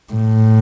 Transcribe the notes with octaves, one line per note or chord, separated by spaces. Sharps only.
A2